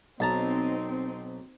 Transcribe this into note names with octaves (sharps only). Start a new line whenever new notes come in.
B1 C4 D#4 A5 A#5